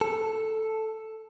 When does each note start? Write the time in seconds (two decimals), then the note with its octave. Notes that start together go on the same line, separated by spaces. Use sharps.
0.01 A4